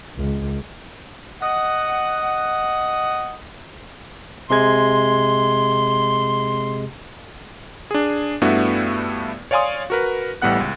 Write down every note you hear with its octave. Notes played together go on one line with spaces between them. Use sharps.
C#2
D#5 F#5
C3 G#3 C6 G#6
D4 G#4
G2 A3 B3 D4 E4 F#4
C#5 D5 F5 G#5 C6 D#6
F#4 A#4 B4
A1 A2 G3 B3 F#5 F#6
C#2